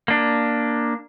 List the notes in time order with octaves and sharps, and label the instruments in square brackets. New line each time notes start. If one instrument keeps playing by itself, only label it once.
[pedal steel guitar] A#3 D4